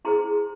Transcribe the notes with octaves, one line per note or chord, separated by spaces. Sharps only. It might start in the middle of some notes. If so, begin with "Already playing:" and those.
E4 G#4 C5 A#5 C6